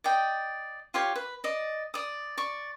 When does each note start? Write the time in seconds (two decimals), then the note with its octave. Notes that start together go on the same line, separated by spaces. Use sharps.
0.04 D5 D#5 G5
0.94 F4 G4 C#5
1.16 B4
1.44 D5 D#5
1.94 D5 D#6
2.37 D5 C#6